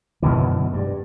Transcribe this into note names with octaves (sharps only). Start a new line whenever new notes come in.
F#2 B2 D3 E3
G2